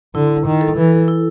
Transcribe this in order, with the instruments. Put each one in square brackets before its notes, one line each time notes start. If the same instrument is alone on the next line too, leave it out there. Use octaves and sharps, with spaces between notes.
[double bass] D3 [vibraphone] E4
[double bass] D#3
[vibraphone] A4
[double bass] E3
[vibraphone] E4